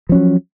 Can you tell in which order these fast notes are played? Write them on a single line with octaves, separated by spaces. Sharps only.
F3 C#4 F#3